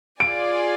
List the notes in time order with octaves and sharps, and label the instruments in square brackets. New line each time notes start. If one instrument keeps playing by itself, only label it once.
[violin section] F4 G#4 D5 G#5 [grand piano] D7